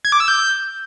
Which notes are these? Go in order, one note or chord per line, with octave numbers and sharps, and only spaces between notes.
G#6
D6
E6
G6